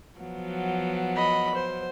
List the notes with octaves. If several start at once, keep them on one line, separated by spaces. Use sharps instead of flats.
F3 F#3 B3
D#5 B5
C5